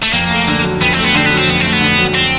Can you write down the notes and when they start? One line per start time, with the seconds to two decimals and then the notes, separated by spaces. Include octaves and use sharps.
0.03 A3
0.13 F2 A#3
0.31 A3
0.47 D3
0.63 F#3
0.80 F2 B3
0.93 A3 C4
1.04 B3
1.14 D3 C4
1.26 F#3 B3
1.37 C4
1.48 F2 B3
1.60 A3 C4
1.72 B3
1.81 D3
1.98 F#3
2.15 C4